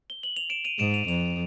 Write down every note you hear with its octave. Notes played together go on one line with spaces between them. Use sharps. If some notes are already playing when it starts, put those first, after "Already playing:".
G7
F#7
F7
D7 E7
D#7 F7
G#2 D7 E7
D#7 F7
F2 D#7 F7